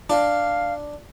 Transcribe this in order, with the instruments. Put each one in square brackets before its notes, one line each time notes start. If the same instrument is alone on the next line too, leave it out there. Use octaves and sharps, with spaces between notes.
[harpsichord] D4 [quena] F5